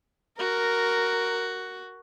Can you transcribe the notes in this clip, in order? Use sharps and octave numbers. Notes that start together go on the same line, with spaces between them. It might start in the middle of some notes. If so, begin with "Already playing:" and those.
F#4 A#4